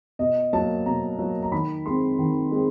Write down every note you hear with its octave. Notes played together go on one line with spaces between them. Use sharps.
B2 D#5
F#3 A#3 A5
B2 A#5
F#3 A#3
A#5
D#3 B5
G#3 C4 C6
D#3
G#3 C4